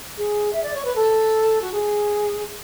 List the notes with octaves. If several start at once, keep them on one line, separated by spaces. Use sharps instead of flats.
G#4
E5
D5
C#5
B4
A4
F#4
G#4